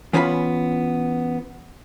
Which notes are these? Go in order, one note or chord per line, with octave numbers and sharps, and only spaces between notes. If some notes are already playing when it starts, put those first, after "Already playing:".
E3 B3 C#4 F4 G#5 B5